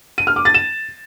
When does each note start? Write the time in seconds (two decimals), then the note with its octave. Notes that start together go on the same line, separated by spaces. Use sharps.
0.18 D#7
0.27 F6
0.36 D6
0.45 A6
0.54 E7